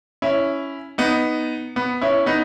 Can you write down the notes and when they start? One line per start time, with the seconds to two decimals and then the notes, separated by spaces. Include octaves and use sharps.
0.22 C#4 E4
0.98 B3 D#4
1.76 B3
2.01 C#4 E4
2.26 B3 D#4